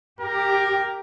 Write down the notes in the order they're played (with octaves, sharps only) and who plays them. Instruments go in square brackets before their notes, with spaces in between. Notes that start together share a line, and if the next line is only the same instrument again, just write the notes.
[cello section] G4 [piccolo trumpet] A#4